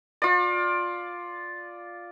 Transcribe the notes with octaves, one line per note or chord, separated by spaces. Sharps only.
F4 D5